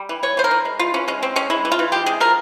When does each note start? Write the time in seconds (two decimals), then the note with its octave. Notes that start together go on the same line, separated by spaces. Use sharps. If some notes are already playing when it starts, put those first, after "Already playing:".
Already playing: G3
0.09 E3
0.23 E3 C#5
0.37 E3 C5
0.44 A#4
0.51 E3
0.65 G#3
0.79 E3 F4
0.94 E3 C#4
1.08 G#3 C#4
1.22 G#3 C4
1.36 G#3 C#4
1.50 G#3 E4
1.65 E3
1.72 F4
1.79 E3
1.92 G#3 G4
2.06 C3 G#4
2.20 F3 A#4